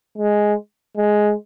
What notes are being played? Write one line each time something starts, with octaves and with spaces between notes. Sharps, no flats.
G#3
G#3